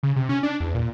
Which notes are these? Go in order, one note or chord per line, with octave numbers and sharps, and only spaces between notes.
C#3
C3
C#4
D4
E2
A#2